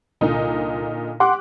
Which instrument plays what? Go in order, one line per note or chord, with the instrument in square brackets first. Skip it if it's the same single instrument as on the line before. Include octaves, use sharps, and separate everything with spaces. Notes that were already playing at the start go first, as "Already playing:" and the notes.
[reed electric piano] C2 [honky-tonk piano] A#2 D3 D#4
[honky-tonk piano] G4 D6 F#6 [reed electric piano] F#5 C6